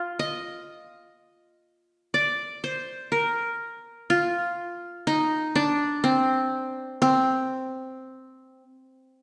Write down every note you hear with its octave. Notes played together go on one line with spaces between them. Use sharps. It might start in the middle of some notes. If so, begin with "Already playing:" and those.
Already playing: F4
D#5
D5
C5
A#4
F4
D#4
D4
C4
C4